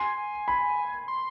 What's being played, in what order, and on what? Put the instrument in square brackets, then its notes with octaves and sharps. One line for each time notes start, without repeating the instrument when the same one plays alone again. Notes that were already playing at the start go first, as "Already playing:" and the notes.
Already playing: [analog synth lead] G#5 [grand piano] C6
[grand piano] B5
[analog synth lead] C6